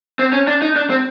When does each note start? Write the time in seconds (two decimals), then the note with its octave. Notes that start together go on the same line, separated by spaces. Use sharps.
0.19 C4
0.33 C#4
0.47 D4
0.62 D#4
0.76 D4
0.90 C4